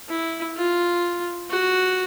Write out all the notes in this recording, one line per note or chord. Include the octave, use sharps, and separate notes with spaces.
E4
F4
F#4